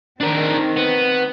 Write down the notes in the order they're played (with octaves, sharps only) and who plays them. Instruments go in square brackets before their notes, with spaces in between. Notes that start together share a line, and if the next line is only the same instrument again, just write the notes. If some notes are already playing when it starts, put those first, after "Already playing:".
[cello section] D#3 C4 [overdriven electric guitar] D4 A#4
[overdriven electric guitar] B3